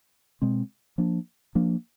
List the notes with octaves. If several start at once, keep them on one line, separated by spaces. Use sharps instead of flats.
B2 G#3 C4
F3 A#3 D4
F3 A#3 D4